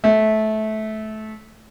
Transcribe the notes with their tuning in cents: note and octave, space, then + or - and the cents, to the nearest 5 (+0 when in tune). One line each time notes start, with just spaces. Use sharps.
A3 -20